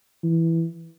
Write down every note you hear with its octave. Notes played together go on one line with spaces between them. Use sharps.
E3